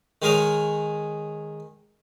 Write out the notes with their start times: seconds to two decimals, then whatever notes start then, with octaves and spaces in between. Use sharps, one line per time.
0.22 D#3 G#3 G#4 A#4 C#5